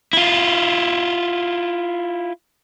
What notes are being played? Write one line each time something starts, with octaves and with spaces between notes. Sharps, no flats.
E4 F4